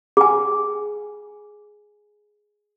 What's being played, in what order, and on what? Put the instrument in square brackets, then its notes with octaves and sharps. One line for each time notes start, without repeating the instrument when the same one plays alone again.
[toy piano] G#4 G#5